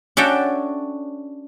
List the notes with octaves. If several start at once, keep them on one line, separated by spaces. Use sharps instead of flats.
C#4 D4 F#4 A4 E5 G5